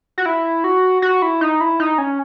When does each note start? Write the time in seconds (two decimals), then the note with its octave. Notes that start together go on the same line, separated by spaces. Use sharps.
0.18 F#4
0.26 E4
0.64 F#4
1.02 F#4
1.22 E4
1.41 D#4
1.61 E4
1.80 D#4
1.98 C#4